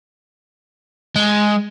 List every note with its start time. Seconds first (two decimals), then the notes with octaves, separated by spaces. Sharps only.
1.16 G#3